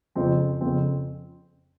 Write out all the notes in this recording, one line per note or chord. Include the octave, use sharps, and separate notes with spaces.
F2 C#3 F3 C4
F2 C#3 F3 C4